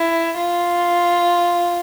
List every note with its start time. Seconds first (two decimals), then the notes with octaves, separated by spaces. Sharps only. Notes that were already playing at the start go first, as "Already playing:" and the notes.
Already playing: E4
0.38 F4